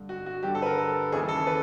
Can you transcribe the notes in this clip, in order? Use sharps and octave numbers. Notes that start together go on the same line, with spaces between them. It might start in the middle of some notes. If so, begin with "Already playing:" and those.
Already playing: G2 D3
F#4
F#4
G2 D3 G4
A4
B4
A#4
A4
D#2 C#3 E3 G#4
A4
B4